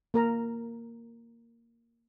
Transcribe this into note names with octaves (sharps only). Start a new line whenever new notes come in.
A#3 A#4 A#5